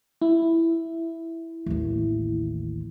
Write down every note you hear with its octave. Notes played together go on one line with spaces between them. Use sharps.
E4
A1 D#2